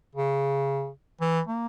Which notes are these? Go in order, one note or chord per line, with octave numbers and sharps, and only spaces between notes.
C#3
E3
A#3